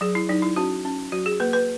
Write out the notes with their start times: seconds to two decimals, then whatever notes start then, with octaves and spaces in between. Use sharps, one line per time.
0.01 F#3 G#4
0.15 E4
0.29 F#3 D#4
0.42 E4
0.56 C#4 F#4
0.85 C#4
1.12 F#3 F#4
1.26 G#4
1.40 A#3 B4
1.53 B4